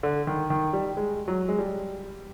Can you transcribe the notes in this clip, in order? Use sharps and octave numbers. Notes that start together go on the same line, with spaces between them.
D3
D#3
D#3
G3
G#3
F#3
G#3
G3